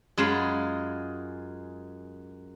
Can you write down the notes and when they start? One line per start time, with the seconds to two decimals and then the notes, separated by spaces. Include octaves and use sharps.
0.17 F#2 G#3 F4 G#4 B5